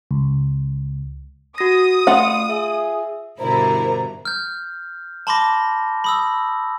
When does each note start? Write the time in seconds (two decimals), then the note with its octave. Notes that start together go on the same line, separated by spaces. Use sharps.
0.11 C#2
1.58 F#4 D#6 A#6
2.07 A3 F4 F#5
2.50 G#4 E5
3.39 G2 B2 D3 E4 A#4 C5 A#5
4.25 F6 G6
5.27 A5 B5 C6 D6 A#6
6.04 B5 D#6 E6